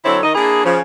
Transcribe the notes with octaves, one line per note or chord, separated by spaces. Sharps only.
D3 F#3 C4 E4 A4 C#5
D#3 D#4 D#5
A#3 D4 E4 G#4
C#3 F3